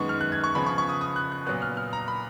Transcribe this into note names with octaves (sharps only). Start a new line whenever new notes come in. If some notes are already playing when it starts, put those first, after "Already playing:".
Already playing: F#2 D#3 G#3 B3 C#6
F6
F#6
G#6
C#6
C#3 F3 B3 B5
C#6
C#6
D#6
D#6
F#6
F#6
A#2 F#3 B3 F#6
F6
F6
A#5
B5